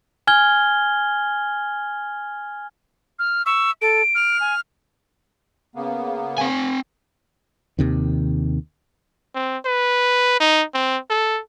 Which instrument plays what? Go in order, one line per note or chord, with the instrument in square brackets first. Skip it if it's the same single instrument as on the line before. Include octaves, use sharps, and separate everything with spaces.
[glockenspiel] G#5 F6 G#6 G7
[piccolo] F6
[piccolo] C#6 [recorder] E6
[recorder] A4 [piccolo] D7
[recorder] F6
[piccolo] G#5
[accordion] C#3 A#3 B3
[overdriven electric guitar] C4 G#5
[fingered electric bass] D#2 C3 D#3
[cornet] C4
B4
D#4
C4
A4